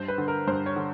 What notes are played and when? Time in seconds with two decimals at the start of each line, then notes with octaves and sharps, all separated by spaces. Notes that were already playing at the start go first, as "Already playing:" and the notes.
Already playing: G2 C5
0.08 B4
0.18 D3
0.28 A#4
0.47 G2 C5
0.66 C#5
0.76 D3